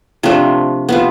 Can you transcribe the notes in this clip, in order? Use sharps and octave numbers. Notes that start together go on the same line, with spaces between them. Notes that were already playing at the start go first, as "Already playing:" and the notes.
C3 F3 A3 D4
C3 F3 B3